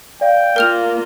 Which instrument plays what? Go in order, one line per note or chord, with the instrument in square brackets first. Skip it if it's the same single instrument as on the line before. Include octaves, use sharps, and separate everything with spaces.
[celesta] D5 F5 [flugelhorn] G5
[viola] A#3 F4 [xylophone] A#4 F6 F7